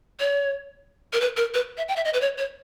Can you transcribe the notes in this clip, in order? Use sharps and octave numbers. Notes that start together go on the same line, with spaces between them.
C#5
A#4
B4
A#4
B4
E5
G5
E5
D#5
B4
C#5
C#5